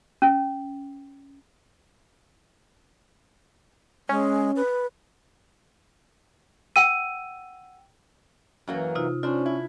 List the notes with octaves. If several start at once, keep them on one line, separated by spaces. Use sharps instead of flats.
C#4
G#3 C#4
B4
F#5 G5 E6 D#7
F#2 E3 F#3 A#3
C3 D#4 F4
C#4 D4 F4 C5
E4